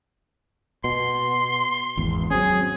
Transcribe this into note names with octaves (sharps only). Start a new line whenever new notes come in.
B2 C6
G#1 E2
F#3 C4 C#4 G#4